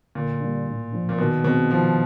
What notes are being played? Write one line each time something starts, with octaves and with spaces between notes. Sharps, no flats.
A#2 D3
G3 A#3 D4
A2
F3 A#3 D4
A#2
B2 D#3
B2 G#3 C4
D#3 F3